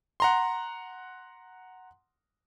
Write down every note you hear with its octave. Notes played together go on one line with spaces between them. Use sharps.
F#5 A#5 C6